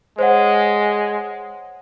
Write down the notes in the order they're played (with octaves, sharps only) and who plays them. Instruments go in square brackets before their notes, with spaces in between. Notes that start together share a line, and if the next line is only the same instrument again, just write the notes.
[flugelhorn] G#3 [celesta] C5 C#5 F#5